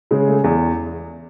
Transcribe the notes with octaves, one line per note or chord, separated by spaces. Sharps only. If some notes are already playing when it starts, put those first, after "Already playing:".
C#3 G#3
A3
E2